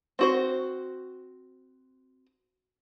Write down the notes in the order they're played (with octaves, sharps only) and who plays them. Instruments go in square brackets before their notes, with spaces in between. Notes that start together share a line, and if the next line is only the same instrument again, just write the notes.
[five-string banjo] C4 F#4 C5